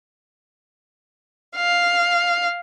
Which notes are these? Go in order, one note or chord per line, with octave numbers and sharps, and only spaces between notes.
F5